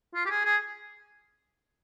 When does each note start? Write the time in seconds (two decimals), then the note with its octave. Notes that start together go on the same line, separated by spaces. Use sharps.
0.15 F4
0.26 G4
0.30 G#4
0.45 G#4